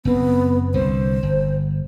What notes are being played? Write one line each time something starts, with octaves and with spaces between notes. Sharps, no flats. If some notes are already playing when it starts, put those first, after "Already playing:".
F#1 B3 C4
C2 D3 C5
G1